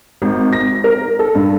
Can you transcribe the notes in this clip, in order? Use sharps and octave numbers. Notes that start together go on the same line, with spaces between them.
G#1
A#6
A#4
A4
G2